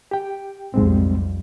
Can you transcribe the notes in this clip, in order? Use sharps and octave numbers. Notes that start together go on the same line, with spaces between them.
G4 G5
B1 F2 G#2 G3 G#3 C4